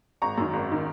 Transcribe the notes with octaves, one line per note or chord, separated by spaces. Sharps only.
G#1 A#5 C#6
F#2 D#3
G#1
D#3